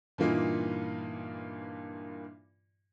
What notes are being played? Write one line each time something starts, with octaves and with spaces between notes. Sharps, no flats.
G2 A#2 E3 A#3 D#4 F4